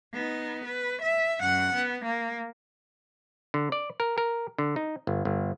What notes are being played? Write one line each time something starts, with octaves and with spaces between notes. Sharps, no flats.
B3 D#4
B4
E5
F#2 F#5
B3
A#3
D3
D5
A#4
A#4
D3
D#4
G1
G1